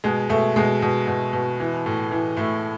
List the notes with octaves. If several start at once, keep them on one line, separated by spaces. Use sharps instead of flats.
B2 G#3
B2 A3
B2 G#3
B2
B2
B2
E3
A2
E3
A2 A3